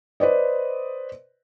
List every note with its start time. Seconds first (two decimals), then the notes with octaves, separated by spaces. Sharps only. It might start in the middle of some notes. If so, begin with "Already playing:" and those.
0.20 B4 C5 D5 D#5